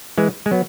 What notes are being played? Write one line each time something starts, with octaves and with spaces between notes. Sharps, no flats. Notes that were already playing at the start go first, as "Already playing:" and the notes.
E3 G#3
G#3
F#3 B3